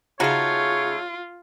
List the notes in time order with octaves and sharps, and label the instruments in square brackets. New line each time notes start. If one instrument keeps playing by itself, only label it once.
[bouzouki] C#3 F5 [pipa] A3 D#4 F#4 [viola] F4 [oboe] C#5